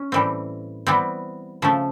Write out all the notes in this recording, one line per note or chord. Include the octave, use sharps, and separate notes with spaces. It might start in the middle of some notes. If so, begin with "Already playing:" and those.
Already playing: C#4
A2 E3 G3 C4
E3 G3 B3 C4
C#3 F3 A3